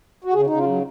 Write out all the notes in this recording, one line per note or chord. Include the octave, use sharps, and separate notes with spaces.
F#4
C#3 G#4
C#3 D#4
F4
F#3